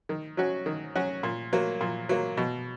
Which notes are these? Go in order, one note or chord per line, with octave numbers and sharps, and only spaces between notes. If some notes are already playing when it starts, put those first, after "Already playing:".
D#3
F#3 C#4 F#4
D#3
F#3 C#4 F#4
A#2
F#3 A#3
A#2
F#3 A#3
B2